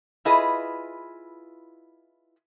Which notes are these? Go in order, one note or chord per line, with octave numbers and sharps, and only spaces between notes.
E4 F4 G#4 B4 D#5